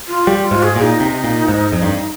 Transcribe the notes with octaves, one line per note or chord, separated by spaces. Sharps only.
F4
G3 G4
F4
G#2
G#4
A#2
D#4
C3
A#2
G#2
F2
G2